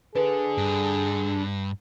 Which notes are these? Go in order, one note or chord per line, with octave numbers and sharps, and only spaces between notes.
D4 G#4 A4 B4
G2